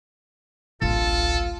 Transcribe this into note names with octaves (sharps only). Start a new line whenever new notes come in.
D1 A1 F4 A4